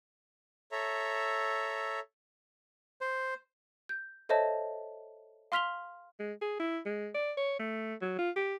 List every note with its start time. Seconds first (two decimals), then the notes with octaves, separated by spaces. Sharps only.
0.72 A4 C#5 E5 A#5
3.01 C5
3.89 G6
4.29 A4 C5 C#5 D#5 E5 A5
5.52 F5 C6 F6 B6 F7 G7
6.20 G#3
6.42 G#4
6.60 E4
6.86 G#3
7.15 D5
7.37 C#5
7.60 A3
8.02 F#3
8.19 F4
8.36 G4